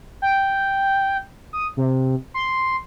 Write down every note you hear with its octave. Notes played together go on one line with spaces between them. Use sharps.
G5
D#6
C3
C6